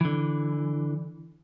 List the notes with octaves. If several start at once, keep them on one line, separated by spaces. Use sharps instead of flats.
D3 E3